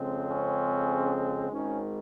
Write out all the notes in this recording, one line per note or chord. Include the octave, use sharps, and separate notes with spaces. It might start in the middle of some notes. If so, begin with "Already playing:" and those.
Already playing: F2 C#3 G#3 C4
C#4
G#1 G#2 D#3 C#4